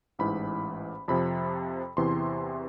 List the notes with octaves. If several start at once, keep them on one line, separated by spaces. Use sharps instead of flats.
A1 G#2 E3 B5
F2 C3 F3 B5
E2 C3 E3 C6